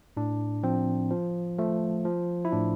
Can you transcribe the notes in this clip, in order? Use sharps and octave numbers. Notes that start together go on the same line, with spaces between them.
A2 D4
F3 C4
F3
F3 A3
F3
E4
A2 D4